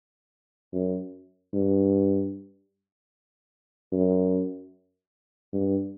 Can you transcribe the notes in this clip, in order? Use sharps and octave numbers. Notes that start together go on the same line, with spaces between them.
F#2
G2
F#2
G2